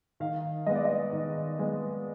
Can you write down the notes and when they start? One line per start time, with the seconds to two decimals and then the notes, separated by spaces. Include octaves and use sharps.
0.20 D#3 F5
0.66 G#3 B3 D#5
0.75 D5
0.85 D#5
1.13 D#3
1.59 G#3 B3